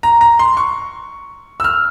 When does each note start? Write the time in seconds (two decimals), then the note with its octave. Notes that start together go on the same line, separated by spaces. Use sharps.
0.03 A#5
0.21 A#5
0.39 C6
0.57 C#6
1.60 E6
1.64 F6